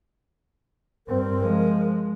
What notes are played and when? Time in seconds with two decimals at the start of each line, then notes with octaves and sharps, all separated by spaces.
1.07 G2 C4 A#4
1.41 F3 G#3